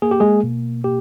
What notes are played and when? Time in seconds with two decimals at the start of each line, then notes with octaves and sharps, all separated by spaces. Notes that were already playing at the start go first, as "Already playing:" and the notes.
0.02 A#3 G#4
0.11 G4
0.20 G#3 G#4
0.43 B2
0.84 A#3 G4